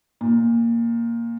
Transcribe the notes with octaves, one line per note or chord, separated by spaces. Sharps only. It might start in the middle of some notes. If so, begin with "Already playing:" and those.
A#2